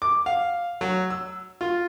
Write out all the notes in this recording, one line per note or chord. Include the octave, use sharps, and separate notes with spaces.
D6
F5
F#3
E6
F4